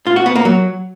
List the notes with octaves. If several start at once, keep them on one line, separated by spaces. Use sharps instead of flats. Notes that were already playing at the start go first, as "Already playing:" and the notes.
F4
F#4
B3
A#3
F#3